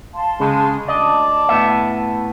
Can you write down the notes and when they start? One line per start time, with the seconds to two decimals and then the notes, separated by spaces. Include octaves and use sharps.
0.14 F5 A5 C6
0.40 C#3 G#3
0.89 D2 D5 D#5 A5
1.49 A2 B3 E5